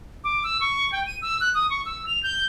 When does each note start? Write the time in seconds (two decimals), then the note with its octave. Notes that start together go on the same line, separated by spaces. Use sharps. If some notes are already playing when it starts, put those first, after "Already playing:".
0.24 D6
0.44 E6
0.61 C#6
0.92 G5
1.06 D#7
1.22 E6
1.41 F#6
1.54 D#6
1.70 C#6
1.86 E6
2.07 F7
2.23 G6